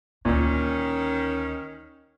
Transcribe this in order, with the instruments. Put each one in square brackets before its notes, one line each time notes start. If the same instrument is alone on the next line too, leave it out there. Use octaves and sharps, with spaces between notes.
[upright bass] D2 D3 [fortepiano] A#2 [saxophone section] D#3 C#4